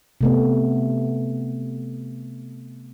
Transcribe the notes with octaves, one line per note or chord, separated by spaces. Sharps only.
C3 A3 B3